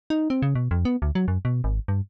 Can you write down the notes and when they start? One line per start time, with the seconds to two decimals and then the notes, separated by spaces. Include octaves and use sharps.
0.10 D#4
0.30 C4
0.42 C#3
0.55 B2
0.71 F2
0.85 B3
1.02 D2
1.15 F#3
1.28 F#2
1.45 B2
1.64 G#1
1.88 G2